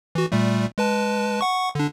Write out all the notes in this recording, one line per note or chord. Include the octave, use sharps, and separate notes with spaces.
E3 F#4
A#2 G3 A3
G#3 B4 A5
F#5 C#6
D3 D4